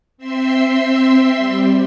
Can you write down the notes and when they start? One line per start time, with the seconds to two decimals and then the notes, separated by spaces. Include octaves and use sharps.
0.18 C4 E5 C6 E6
1.37 G3